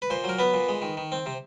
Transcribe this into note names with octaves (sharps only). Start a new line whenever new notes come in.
B4
A#2 C5
F#3 A#4
B3 B4
A#2
G#3
D#3
D#3
C4
C3